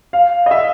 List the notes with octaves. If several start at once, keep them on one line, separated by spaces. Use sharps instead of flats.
F5
D#5
E5